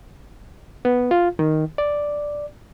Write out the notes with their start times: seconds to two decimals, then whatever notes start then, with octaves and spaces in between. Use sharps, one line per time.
0.85 B3
1.11 F4
1.39 D#3
1.78 D5